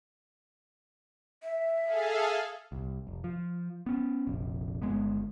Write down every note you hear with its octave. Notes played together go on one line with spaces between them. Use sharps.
E5
G#4 A4 F5
C2
F1
F3
B3 C#4
F1 A#1
G1 E2 G#3 B3